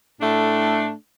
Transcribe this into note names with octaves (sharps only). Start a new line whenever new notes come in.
A2 A3 D4 A4